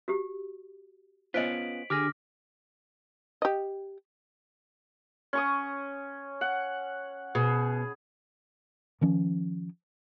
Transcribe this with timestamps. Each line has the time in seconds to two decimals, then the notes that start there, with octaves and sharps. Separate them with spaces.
0.08 F#4 G4
1.34 B3 C#4 F4 C5 D#5 B6 D7 F#7
1.90 D3 G4 G#4 D6 F6 A#6
3.42 G4 D#5
5.33 C#4 C#6 D#6
6.41 F#5
7.35 B2 G#4
9.01 D#3 F3 C#4